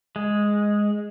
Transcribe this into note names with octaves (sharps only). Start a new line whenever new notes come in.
G#3